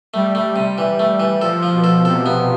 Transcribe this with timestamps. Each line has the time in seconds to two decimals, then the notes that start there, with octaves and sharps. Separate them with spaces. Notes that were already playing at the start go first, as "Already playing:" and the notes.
0.14 G3 A3
0.35 A3
0.56 C3
0.78 E3
0.99 A3
1.20 E3
1.41 F3 A4
1.63 F3
1.73 B2
1.84 A4
2.05 C3 A4
2.26 B3